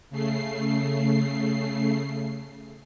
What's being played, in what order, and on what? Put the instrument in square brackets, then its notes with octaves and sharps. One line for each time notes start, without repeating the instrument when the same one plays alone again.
[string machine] C#3 A3 C7